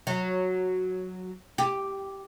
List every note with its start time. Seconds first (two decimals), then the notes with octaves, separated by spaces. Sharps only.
0.07 F#3
1.58 G4